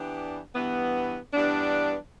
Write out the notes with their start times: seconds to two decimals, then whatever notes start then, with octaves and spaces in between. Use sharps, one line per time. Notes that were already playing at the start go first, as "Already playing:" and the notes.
Already playing: E3 B3 D4 G4
0.55 G2 E3 B3
1.33 G2 E3 B3 D4